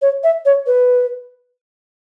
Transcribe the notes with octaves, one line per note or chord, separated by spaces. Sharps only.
C#5
E5
C#5
B4